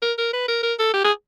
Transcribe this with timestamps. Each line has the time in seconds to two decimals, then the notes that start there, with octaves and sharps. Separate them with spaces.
0.02 A#4
0.18 A#4
0.33 B4
0.48 A#4
0.63 A#4
0.79 A4
0.94 G4
1.04 G#4